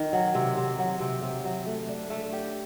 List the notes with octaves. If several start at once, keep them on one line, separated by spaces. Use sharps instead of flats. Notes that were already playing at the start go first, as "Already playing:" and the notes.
Already playing: D#3
F#3
C3
C3
F#3
C3
C3
F#3
A3
D4
A3
G4